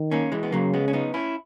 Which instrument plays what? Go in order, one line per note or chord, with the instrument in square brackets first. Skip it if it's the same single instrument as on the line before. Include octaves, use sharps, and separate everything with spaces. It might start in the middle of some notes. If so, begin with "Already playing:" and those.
Already playing: [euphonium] D#3
[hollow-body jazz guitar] A#3 C#4
E3 G#3
B3
[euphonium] C#3 [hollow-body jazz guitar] F#3 A#3
[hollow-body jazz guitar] G#3 B3
C#4
B3 D#4
C#4 E4